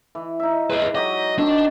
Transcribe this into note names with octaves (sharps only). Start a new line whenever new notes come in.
E3
D#4 E5
G#3 G#4 B4
F#3 F#4 G4 D#5
D#3 C4 D4 D#5